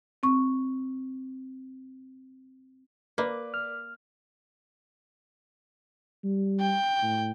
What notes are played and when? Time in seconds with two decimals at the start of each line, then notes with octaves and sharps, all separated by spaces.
0.23 C4 C#6
3.18 A#3 A#4 B4 D5 D6
3.54 F6
6.24 G3
6.60 G5
7.02 A2